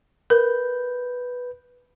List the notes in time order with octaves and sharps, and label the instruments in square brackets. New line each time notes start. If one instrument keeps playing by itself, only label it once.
[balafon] A#4 [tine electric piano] B4 G6